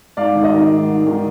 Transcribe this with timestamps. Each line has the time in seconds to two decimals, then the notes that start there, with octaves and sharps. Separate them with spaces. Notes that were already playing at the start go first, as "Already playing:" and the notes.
0.17 G#2 D5 F5
0.35 D#3
0.44 D#5
0.53 D#3
0.71 G#2
0.89 G#2
1.07 D#3